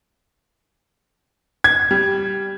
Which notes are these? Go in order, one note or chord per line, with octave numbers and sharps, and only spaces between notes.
G#6
G3